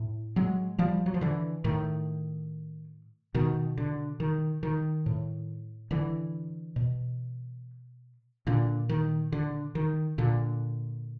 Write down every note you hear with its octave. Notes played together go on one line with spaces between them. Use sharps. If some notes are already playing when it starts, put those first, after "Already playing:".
Already playing: A2
F#3 G#3
F3 G3
F#3
F3
D3 E3
A2 D#3
B2 D#3
D3
D#3
D#3
A2
D3 E3
B2
A#2 D3
D#3
D3
D#3
A#2 D3